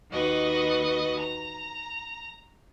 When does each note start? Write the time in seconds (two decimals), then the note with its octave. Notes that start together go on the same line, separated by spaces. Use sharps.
0.12 D#2 F#4 B4 D#5
1.19 A#5